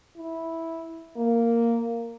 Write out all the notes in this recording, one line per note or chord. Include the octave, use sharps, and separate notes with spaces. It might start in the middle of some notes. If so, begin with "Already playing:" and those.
E4
A#3